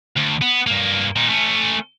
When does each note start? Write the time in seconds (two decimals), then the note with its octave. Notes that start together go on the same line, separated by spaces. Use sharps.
0.17 D2
0.42 B3
0.67 G2 A#3
1.16 A#2 D#4
1.29 A3 C#4